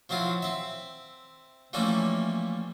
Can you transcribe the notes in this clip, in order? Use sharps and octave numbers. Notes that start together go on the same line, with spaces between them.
F3 F#3 C4 E4 F4
C4 E5
E3 F3 G3 A3 A#3 C#4